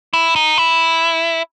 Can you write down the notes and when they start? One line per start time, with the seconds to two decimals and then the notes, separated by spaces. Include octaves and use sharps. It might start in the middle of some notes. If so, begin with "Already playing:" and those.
0.13 E4
0.36 D#4
0.58 E4